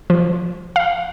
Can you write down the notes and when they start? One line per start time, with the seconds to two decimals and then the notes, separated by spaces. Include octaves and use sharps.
0.10 F3
0.76 F5